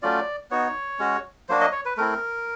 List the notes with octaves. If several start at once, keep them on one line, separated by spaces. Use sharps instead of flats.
F#3 A3 C#4 F4 D5
B3 D#4 F#4 C#5
G#3 C#4 F#4
F#3 A#3 D4 F#4 C5
D#5
C#5
B4
A3 C4 E4 A#4